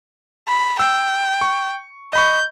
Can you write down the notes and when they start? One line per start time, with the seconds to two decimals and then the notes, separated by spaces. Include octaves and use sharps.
0.48 B5
0.79 G5 E6
1.41 C#6
2.13 D#5 B5 C#6 G6